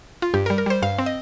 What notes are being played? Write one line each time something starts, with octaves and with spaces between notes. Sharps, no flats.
F4
G2 G4
A#4
G3
A#4
G3 C5
G2 F5
C4
D#5